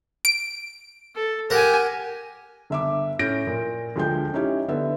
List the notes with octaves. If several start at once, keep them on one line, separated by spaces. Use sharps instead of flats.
D7
A4
G4 A#4 F#5 G#5
G1 E5 D6
A2 C#4 G6 A#6 D7
A#2
D2 F3 G#3 G5 G6
C#4 D#4 E4 G4
D3 B3 E5